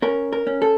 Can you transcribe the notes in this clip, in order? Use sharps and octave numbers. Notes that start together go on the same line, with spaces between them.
C#4 A#4
A#4
C#4
A4